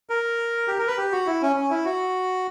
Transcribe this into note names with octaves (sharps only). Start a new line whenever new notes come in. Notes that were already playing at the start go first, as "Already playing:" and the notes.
A#4
G4
A#4
B4
G4
F#4
E4
C#4
C#4
E4
F#4